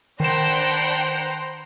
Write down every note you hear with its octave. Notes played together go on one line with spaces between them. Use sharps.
D#3 D4 B4 C5 F#5 G5 A#5 E7